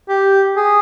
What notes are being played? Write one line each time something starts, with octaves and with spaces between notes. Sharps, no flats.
G4
G#4